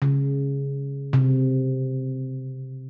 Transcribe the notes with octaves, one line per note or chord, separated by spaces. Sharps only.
C#3
C3